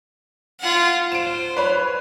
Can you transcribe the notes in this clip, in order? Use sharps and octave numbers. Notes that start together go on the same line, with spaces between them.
F4 F#5
C5 D7 E7
B4 C#5